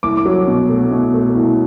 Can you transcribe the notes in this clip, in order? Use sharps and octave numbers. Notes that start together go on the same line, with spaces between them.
C2 D6
D6
F#3
B2
A3
B2
A3
C2